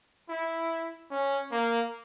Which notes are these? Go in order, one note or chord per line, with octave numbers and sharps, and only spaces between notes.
E4
C#4
A#3